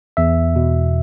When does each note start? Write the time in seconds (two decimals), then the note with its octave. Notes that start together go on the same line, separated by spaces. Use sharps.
0.17 E2 E5
0.56 B2